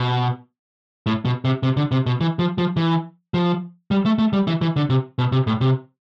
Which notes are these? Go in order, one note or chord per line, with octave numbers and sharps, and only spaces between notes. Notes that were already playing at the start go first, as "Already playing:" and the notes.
Already playing: B2
A2
B2
C3
C3
D3
C3
B2
E3
F3
F3
E3
F3
G3
A3
A3
G3
E3
E3
D3
C3
B2
C3
A2
C3